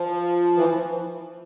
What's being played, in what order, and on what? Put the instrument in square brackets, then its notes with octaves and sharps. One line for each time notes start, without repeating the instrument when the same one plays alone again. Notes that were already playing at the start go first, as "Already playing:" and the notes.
Already playing: [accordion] F3
E3